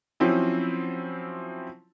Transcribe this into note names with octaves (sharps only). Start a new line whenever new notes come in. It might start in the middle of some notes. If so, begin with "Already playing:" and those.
F3 F#3 C4 C#4 E4